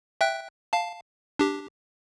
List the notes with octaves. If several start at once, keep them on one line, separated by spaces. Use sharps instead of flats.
E5 G5 F#6
F5 A5
D4 G4